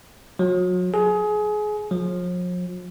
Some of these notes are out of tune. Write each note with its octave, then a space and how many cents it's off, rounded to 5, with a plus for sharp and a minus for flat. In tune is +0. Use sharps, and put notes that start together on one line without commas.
F#3 -30
G#4 +25
F3 +45